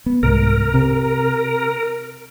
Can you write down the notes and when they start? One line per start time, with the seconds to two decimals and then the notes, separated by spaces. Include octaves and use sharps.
0.06 B3
0.23 C2 G#2 A#4
0.74 C3